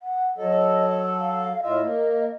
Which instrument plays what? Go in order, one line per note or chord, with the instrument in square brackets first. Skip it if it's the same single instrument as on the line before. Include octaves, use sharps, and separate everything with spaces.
[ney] F#5
[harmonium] F#3 A4 [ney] D#5
[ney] F5
[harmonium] A2 F4 E5 [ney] D#5
[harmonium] A#3